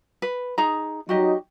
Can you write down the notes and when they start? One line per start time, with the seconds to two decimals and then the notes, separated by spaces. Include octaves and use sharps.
0.22 B4
0.58 D#4 G#4 A#5
1.09 F#3 D#4 F#4 G4 D#5